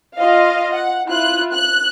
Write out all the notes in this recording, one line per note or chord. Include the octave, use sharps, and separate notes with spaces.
F4 D#5 F5
F#5
E4 F4 F#6
F#6